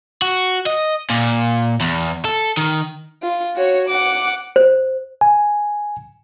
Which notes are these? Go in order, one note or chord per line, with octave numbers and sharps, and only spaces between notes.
F#4
D#5
A#2
E2
A4
D#3
F4
F#4 C#5
F#5 D6
C5
G#5